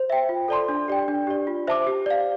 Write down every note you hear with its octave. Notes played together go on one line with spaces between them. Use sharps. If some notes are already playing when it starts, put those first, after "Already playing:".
Already playing: C5
E5 G5
F4
A4 D5 A5 C6
D4
G4 D5 G5
D4
G4 D5
F4
C5 E5 A5 D6
G4
D5 F5